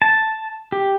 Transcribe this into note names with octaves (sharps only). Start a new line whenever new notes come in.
A5
G4